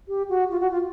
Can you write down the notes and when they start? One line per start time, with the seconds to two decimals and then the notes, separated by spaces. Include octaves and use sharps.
0.08 G4
0.29 F#4
0.51 F4
0.60 F#4
0.71 F4